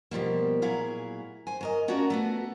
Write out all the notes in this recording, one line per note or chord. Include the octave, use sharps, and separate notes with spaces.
B2 F3 G3 A#3
A#2 F#3 E4 G#4 F5
C5 G#5
F#3 A#4 D#5
C#4 F4 F#4 A4 A#4 D5
A3 B3 F#4